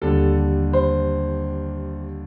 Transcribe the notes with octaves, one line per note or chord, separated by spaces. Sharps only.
D#2 D3 G3 A4
C5